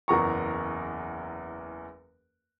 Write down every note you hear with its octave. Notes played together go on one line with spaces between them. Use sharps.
F#1 E2 A#5 C#6